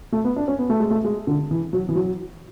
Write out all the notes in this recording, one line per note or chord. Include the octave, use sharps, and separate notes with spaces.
A3
B3
D4
C#4
B3
A3
G#3
A3
G#3
D3
E3
F#3
E3
F#3